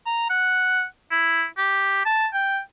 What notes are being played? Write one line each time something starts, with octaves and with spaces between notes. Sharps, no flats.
A#5
F#5
E4
G4
A5
G5